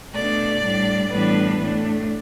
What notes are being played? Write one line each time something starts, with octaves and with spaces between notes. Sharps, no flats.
B2 A3 D4 D5
A2 G3 D4
A2 E3 G3 B3 D4 B4
A2 A3 D4